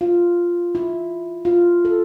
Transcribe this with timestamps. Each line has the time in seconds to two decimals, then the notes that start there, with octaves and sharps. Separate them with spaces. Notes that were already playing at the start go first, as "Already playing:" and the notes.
0.01 F4
0.75 E4
1.45 F4
1.85 A4